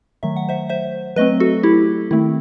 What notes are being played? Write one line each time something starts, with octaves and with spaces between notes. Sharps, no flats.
D#3 F#3 A3 E5
F#5
C5 E5
C5 E5
F#3 A3 C4 B4 D#5
F#4 A4
E4 G4
D#3 A3 C4 E4